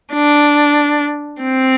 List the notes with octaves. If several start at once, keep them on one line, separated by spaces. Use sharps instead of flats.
D4
C4